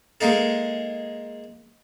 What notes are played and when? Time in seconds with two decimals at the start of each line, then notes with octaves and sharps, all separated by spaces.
0.21 G#3 A#3 D#4 A4